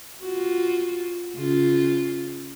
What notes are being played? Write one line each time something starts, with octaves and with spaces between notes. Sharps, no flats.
F4 F#4
C#3 F4